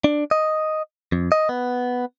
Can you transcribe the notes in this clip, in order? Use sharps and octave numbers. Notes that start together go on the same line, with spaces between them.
D4
D#5
F2
D#5
B3